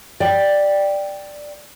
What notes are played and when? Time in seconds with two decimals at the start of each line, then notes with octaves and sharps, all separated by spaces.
0.20 D5 G5